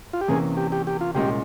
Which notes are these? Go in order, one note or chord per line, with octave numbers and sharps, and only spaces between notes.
F4
G4
E2 C3 E3 A#3 C#4 G#4
G4
G4
G4
F4
C2 A#2 G#3 C#4 G4